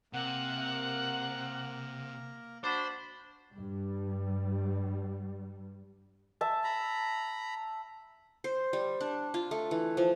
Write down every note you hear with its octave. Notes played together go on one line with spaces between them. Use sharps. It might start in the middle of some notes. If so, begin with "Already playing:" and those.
C3 A#3 A#4 F#5
D4 F#4 C5 B5
G2 G3
E5 A5
A#5 B5
C5
G3
D4
F4
A3
E3
F3